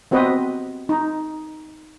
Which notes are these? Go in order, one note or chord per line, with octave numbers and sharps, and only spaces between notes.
B3 C4 F#4 B4 D#5
D#4